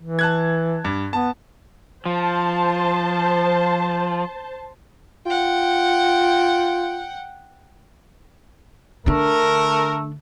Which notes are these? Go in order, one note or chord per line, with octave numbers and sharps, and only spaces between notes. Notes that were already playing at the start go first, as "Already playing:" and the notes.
E3
A5 F#6 G#6
G2
B3 A5
F3 C5 A5
F4 F#5 G5
D3 A3 D4 A#4